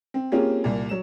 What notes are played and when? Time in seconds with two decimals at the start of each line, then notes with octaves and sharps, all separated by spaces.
0.14 C4
0.32 A#3 C4 C#4 F4 G4 G#4
0.64 C2 A#2
0.89 F#3 E7